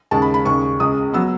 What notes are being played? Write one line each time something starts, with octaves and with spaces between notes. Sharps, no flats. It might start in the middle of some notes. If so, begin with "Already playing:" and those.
D#2 C#3 G#3 A5
B5
B5
D#2 C#3 G#3 C#6
C#2 C#3 G#3 D#6
F#3 B3 E6